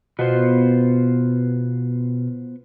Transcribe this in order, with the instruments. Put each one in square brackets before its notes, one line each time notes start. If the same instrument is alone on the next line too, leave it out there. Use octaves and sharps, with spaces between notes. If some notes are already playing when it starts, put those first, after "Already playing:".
[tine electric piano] B2 [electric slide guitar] B3 F4 C5